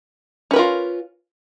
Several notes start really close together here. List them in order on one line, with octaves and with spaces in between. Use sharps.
C#4 B4 A#4 F4